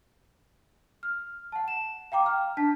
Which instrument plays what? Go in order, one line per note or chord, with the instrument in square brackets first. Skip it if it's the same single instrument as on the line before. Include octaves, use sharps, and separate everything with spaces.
[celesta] F6
F#5 A5
E7
F5 G5 A#5 D6
F6
D4 A5 B6